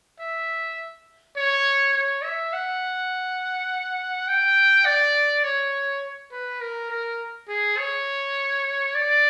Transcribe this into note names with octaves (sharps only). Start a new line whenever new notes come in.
E5
C#5
C#5
E5
F#5
G5
D5
C#5
B4
A#4
A#4
G#4
C#5
D5